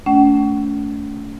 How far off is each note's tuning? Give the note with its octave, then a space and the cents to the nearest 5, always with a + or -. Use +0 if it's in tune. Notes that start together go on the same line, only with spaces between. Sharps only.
A3 +0 C#4 +45 F#5 +40